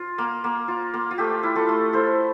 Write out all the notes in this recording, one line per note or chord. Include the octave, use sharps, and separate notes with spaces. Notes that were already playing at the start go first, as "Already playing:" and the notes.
Already playing: F4
A#3
A#3
F4
A#3
F4
A3 G4
E4
F4 A4
A3
E4 A4 C5